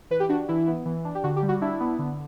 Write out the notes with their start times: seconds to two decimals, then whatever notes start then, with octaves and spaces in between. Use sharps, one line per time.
0.10 E3 B4
0.20 G4
0.29 D4 F#4
0.49 E3 E4
0.67 B3
0.85 E3
1.05 D4
1.15 G4
1.24 D3 F#4
1.36 G4
1.42 G3
1.49 F#4
1.61 D4 E4
1.80 B3
1.99 D3